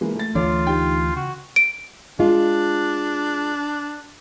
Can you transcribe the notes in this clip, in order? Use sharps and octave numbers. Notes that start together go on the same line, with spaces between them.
E3 G#3 A#3
A3 A6
D2 E3 A3 D4 F4 C#5 D6
D#4 G4 G5
C#3 F#4
D7
G#3 D4 F4